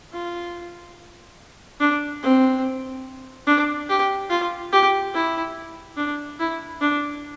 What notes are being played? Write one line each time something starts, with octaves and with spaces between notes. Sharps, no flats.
F4
D4
C4
D4
G4
F4
G4
E4
D4
E4
D4